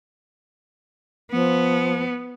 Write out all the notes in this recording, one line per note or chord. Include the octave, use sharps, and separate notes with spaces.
F3 B3